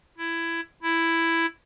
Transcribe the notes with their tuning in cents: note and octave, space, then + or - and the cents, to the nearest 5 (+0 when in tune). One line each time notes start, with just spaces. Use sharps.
E4 +15
E4 +5